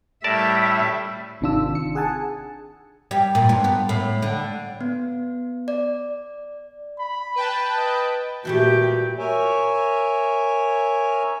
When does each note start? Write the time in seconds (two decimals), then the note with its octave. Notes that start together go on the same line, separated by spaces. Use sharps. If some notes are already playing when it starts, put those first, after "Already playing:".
0.24 A2 G3 A#4 D5 E5 A5
1.41 G#1 C3 D#3 D4 F4 E6
1.75 C#7
1.95 G#4 F#5 G#5 A5
3.11 G3
3.35 A#2
3.49 G2
3.64 B3
3.89 A2
4.22 D3
4.81 B3
5.68 D5
6.99 B5
7.36 B4 G5 A5
7.77 D#5
8.45 A#2 E3 G3 A3 F#4 G4 G5
9.17 A#4 C#5 E5 G#5